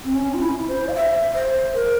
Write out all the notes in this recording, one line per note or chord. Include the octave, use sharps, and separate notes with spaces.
C4
C#4
F4
E4
C5
F5
E5
C5
A#4